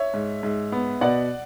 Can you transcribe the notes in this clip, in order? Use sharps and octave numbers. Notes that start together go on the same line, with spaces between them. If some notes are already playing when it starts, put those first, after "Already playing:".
Already playing: C#5 E5
G#2
G#2
B3
B2 D5 F#5